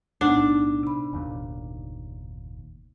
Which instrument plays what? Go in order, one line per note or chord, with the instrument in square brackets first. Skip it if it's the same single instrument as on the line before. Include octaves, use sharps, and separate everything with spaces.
[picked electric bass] B1 A2 [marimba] B3 D#4 F#5 [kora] D4
[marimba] C3 B5
[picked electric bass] F#1 D#2 A#2